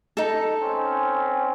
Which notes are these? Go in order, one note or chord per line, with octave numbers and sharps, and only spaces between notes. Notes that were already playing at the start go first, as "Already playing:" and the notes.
D#4 A4
C4 C#4